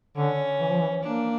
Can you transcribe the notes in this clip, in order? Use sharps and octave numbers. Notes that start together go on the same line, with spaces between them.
D3 C#4
E3
F3
E3
A#3 D4